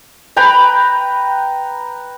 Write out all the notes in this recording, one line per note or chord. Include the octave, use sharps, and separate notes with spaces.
B4 G5 A#5 B5